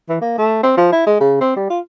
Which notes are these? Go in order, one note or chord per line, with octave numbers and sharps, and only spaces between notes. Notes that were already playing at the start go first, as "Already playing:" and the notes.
E3
A#3
A3
C4
F3
E4
G#3
C#3
C4
G3
F4